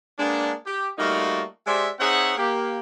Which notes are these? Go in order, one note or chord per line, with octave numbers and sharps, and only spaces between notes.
G#3 A#3 B3 D4
G4
G3 A3 A#3 D#4 F4 F#4
G#3 G4 C5 D5 E5
C4 D#4 G#4 C#5 E5 F#5
A#3 G4